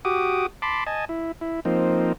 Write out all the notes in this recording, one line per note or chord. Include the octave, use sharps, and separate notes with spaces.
F#4 G4 D6 D#6
A5 B5 C6 D6
D#5 G#5 A5
E4
E4
F3 A#3 C4 D#4